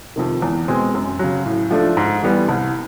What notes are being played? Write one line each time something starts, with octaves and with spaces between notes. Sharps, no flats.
F2 C3 D#3
E2
B2 G#3 C4
F#2
C#3 F#3
A2
F3 A3 D4
G#2
E3 G3 B3
C2